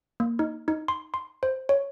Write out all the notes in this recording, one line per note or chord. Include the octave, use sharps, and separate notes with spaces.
A#3
D#4
D#4
C6
C6
C5
C#5